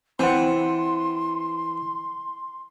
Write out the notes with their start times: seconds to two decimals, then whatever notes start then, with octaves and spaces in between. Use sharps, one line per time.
0.19 E3 C4 F#5 C6